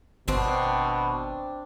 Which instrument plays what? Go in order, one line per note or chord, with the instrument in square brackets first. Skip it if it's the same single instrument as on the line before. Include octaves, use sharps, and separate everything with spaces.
[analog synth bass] G#1 [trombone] B2 [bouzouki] C4 D4